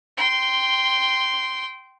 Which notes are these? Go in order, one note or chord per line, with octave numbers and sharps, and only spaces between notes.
G5 C6